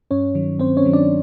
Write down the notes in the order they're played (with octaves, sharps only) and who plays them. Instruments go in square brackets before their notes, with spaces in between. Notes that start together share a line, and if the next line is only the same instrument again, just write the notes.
[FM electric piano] G2 C#4 C#5
D#3 F#3
G2 C4 C5
C#4 C#5
D#3 F#3
D4 D5